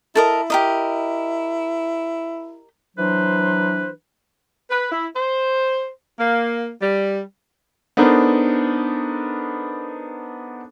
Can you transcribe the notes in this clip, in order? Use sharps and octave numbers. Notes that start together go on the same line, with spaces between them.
E4 A4 A#4 D#5
G4 A#4 D#5
E3 F#3 D4 B4 C5
B4
E4
C5
A#3
G3
B3 D4 D#4 A4 A#4 C5